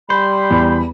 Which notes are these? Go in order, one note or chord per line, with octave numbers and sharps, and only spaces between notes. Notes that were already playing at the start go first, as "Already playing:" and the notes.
G3 C5 B5
E2